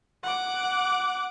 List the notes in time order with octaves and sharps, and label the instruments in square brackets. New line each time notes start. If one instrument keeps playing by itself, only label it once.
[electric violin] F#5 D6